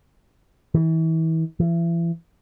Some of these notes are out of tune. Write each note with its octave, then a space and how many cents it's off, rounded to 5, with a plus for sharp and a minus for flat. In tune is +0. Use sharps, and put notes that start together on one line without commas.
E3 -35
E3 +35